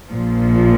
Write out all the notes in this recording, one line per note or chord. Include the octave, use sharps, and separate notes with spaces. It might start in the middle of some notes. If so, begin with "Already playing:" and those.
A#1 A#2 F3